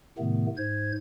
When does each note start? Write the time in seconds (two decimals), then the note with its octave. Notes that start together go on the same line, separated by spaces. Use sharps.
0.18 A2 C3 D#3 A3 B3
0.57 G#2 C5 G#6